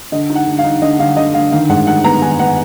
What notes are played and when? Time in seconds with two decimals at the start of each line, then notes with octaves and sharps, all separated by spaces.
0.12 D3 D#5
0.30 D#4
0.35 F#5
0.47 D3
0.59 F5
0.64 D#4
0.82 D3 D#5
0.99 D3 F5
1.17 D3 D#5
1.34 D3 F5
1.52 D#3 F5
1.69 G#2 F#5
1.87 D#3 F#5
2.04 B3 A#5
2.22 D#3 G#5
2.39 B3 F#5